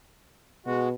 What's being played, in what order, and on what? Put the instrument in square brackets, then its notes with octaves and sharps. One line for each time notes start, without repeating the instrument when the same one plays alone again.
[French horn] B2 [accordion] G#3 F#4